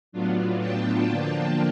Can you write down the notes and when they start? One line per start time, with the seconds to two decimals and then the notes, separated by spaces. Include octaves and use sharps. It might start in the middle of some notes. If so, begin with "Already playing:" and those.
0.12 A2 F#3 B3 D4 F4
0.60 G5 A5
1.06 D3 F3 A#3 D4 F4